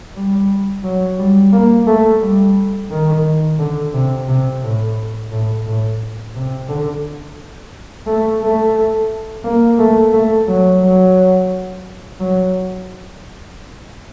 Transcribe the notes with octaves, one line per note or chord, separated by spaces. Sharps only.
G3
F#3
G3
A#3
A3
G3
D#3
D3
C3
C3
A2
A2
A2
C3
D3
A3
A3
A#3
A3
A3
F#3
F#3
F#3